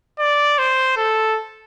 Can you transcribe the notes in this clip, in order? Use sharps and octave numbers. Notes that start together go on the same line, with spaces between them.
D5
C5
A4